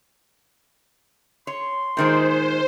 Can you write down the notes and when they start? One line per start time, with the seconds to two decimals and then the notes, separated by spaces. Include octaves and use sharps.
1.47 C#5 C6
1.97 A#2 D#3 G#3 C5